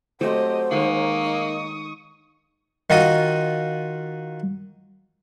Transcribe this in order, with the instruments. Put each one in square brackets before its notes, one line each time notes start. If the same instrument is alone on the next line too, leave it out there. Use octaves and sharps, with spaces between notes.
[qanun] F#3 A3 C4 [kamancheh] G4 D#5 [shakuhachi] C5
[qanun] D#3 G#3 C#5 [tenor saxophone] A#3 [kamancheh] C#6 D#6
[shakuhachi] D#4
[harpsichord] D#3 F4 F#4 D#5